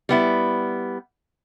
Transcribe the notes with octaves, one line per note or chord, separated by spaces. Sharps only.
G3 B3 E4